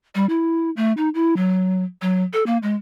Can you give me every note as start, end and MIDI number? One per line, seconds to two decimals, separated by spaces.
0.15 0.26 55
0.29 0.70 64
0.77 0.93 57
0.97 1.09 63
1.14 1.36 64
1.36 1.84 54
2.02 2.23 54
2.33 2.44 69
2.46 2.58 58
2.63 2.75 56